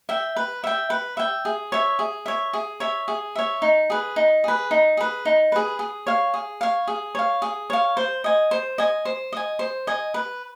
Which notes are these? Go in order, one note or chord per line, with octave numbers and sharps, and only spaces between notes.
E5 G5
B4
E5 G5
B4
E5 G5
G#4
C#5 E5
G#4
C#5 E5
G#4
C#5 E5
G#4
C#5 E5
D#4
G#4 B4
D#4
G#4 B4
D#4
G#4 B4
D#4
G#4 B4
G#4
C#5 F5
G#4
C#5 F5
G#4
C#5 F5
G#4
C#5 F5
C5
D#5 G#5
C5
D#5 G#5
C5
D#5 G#5
C5
D#5 G#5
B4